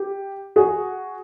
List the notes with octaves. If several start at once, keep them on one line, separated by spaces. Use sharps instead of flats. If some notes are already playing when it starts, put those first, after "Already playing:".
Already playing: G4
F#4 G#4